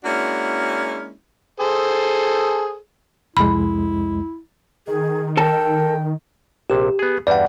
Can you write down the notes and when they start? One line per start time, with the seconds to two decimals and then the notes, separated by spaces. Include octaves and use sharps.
0.04 G#3 A#3 C#4 D4 E4 F#4
1.60 G#4 A4 C5
3.37 C2 F2 G#3 E4 B5
4.87 D#3 G#4
5.37 A4 A#4 G5 A5
6.70 A#1 C3 G4
6.99 B3 G#4
7.27 E2 G2 G3 D5 F#5